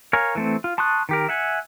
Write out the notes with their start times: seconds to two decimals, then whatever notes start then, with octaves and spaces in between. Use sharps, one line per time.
0.13 A#4 C#5 F5 G#5
0.35 E3 A3 C4
0.64 F4
0.78 A5 C6 C#6 D#6 F#6
1.09 D#3 G4 A#4
1.29 E5 F#5 G#5